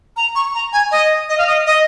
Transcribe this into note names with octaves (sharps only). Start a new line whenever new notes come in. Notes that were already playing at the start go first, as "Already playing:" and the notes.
A#5
C#6
A#5
G#5
D#5
D#5
F5
D#5
D#5